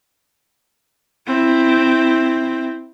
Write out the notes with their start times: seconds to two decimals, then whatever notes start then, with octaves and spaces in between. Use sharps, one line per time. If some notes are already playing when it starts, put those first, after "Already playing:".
1.27 C4 E4